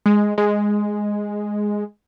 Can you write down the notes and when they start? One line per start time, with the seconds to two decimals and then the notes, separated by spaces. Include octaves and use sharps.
0.06 G#3
0.38 G#3